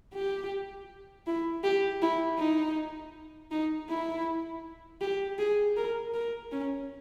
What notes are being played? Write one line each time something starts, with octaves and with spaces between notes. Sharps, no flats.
G4
E4
G4
E4
D#4
D#4
E4
G4
G#4
A#4
A#4
C#4